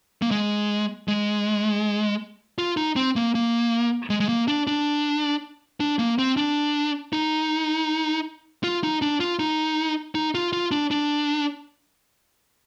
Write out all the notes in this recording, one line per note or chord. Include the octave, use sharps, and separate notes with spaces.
A#3
G#3
G#3
F4
D#4
C4
A#3
A#3
G#3
G#3
A#3
D4
D4
D4
A#3
C4
D4
D#4
F4
D#4
D4
F4
D#4
D#4
F4
F4
D4
D4